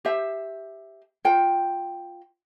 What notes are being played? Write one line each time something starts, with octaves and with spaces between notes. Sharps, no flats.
G4 C5 E5
F4 C5 G5